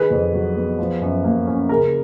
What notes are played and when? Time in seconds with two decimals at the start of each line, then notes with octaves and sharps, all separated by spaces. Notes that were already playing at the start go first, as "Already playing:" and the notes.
Already playing: D#3 G#4 B4
0.11 F2
0.33 F#3
0.56 B3
0.79 F3
1.01 F#2
1.24 A#3
1.47 C#4
1.69 C#3 A#4